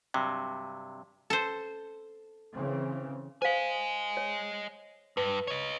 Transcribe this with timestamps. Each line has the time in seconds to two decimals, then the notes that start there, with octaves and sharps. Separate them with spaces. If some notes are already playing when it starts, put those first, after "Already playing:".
0.14 G2 C3 F#3
1.30 A4 C5
2.54 C#3 E3 C4
3.42 C5 D#5 F5 G#5
4.17 C#5
5.17 G2 B4
5.47 C#5 D#5